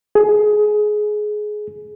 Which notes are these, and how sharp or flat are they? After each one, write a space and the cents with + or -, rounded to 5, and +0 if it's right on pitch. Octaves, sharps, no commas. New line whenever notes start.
G#4 +20